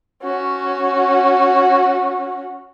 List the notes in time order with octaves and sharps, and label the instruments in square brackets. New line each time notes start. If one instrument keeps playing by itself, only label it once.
[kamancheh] C#4 F#4